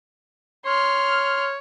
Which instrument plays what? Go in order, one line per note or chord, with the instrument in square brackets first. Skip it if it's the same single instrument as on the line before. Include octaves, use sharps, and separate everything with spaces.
[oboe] C#5 [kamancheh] C6 F6